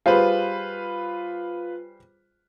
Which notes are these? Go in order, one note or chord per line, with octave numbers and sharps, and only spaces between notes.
G3 F4 G#4 B4 C5